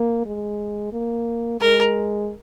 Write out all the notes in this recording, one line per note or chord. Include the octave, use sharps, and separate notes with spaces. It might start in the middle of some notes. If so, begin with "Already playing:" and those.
Already playing: A#3
G#3
A#3
G#3 A#4